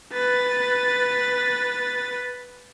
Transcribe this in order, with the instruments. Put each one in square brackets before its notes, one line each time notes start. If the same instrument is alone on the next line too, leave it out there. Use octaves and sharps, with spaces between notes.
[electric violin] B4 A6